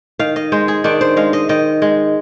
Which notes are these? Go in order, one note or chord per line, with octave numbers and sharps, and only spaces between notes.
D#3 F5
D#5
G#3 C5
G#4
D#3 D4
C5
G#3 F5
D#5
D#3 D#5
G#3